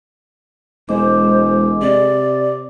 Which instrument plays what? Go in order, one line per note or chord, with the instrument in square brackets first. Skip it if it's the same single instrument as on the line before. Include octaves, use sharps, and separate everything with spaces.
[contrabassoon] E1 [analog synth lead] G#3 [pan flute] C5 [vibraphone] D6
[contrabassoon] C3 [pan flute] D5